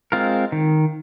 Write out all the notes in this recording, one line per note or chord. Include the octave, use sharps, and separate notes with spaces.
G#3 C4 F4 A#4
D#3